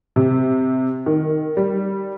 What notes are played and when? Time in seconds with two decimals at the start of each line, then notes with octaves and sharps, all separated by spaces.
0.16 C3
1.06 D#3
1.57 G3